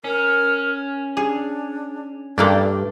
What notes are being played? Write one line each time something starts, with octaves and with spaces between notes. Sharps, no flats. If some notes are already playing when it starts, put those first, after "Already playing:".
C#4 A#4
D4 G#4
G2 A3 A#3 D4 D5